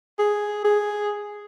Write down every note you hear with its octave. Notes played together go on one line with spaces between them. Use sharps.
G#4
G#4